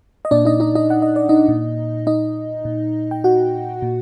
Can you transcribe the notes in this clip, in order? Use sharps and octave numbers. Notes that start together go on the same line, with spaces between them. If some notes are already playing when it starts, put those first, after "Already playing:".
D#5
A#2 D4 D5
D#4 D#5
D#4 D#5
D#4 D#5
F#5
D#5
D5
D#4 D#5
A#2
D#4 D#5
A#2
G5
F#4 F#5
A#2